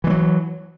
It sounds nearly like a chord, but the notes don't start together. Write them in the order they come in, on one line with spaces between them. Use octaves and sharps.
E3 G#3 F#3